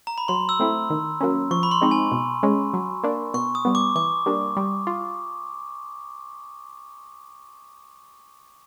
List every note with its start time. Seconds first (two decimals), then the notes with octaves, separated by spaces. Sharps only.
0.07 A#5
0.18 B5
0.28 F#3 C6
0.49 E6
0.60 A3 C4 E4
0.90 D#3
1.21 F#3 A#3 C#4
1.51 F3 C#6
1.63 B5
1.71 C6
1.81 G#3 C4 D#4
1.91 G#5
2.12 B2
2.43 G#3 C#4
2.73 F#3
3.03 A#3 D4
3.34 B2 C#6
3.55 D#6
3.65 G3 B3
3.75 D6
3.95 E3 D6
4.26 G3 A#3 D4
4.57 G3
4.87 F4